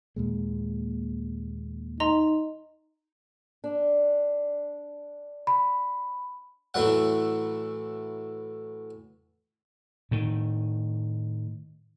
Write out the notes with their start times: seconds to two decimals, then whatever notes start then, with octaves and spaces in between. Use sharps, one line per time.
0.16 D#2 A#2 G#3
2.00 D#4 D#5 A#5 C6
3.64 D4
5.47 B5
6.74 A2 E3 F#3 F#5
10.11 A2 D#3